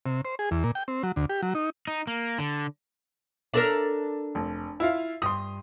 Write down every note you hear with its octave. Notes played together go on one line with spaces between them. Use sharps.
C3
C5
G#4
E2
A#2
G5
C4
F#3
D2
G4
F#3
D#4
D#4
A#3
D3
D4 A4 A#4
F1
E4 F4 F5
G2 C6 D#6